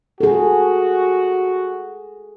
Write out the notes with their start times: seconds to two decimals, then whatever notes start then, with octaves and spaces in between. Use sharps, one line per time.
0.20 F#4 G#4 A4